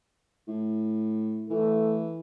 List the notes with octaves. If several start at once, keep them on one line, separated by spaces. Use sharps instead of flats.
A2
E3 A3